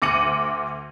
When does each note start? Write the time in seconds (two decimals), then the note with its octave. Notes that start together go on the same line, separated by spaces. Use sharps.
0.02 D2 D6 A#6 C#7 D#7 F#7